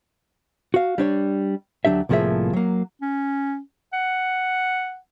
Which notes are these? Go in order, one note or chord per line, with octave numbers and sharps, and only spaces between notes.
F#4 F5
G3 D4 C#5
D2 F#3 D4 G4 E5
C2 A2 F3 A#3 G#4 E5
F#3 A#3
C#4
F#5